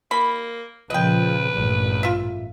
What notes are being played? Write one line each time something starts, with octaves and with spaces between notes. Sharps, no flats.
A#3 B5
A#2 C#3 F3 B4 D#5 G5
A1 G2 A#2
F4 E5